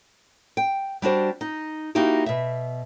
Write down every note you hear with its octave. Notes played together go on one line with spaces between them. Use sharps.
G5
G3 D4 F#4 C5
D#4
A#3 D#4 E4 F#4 G4
B2 E5